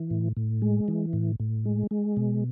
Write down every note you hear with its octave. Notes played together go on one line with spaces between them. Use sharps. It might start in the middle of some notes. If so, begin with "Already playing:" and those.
Already playing: E3
A2
A2
G#3
E3
A2
A2
G#3
G#3
B2